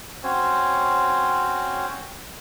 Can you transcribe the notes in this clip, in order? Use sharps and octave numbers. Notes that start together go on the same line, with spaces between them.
C4 C#4 F#4 C5 C#5